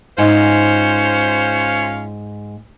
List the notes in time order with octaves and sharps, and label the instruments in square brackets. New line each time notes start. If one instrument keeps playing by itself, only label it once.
[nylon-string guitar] G#2 [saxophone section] C#4 F4 C5